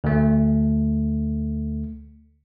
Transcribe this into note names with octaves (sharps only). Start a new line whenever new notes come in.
D2 A3